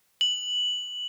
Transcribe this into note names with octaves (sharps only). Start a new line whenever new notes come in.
F#7